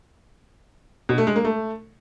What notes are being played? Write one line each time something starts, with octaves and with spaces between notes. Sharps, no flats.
B2
A3
G#3
A#3
A3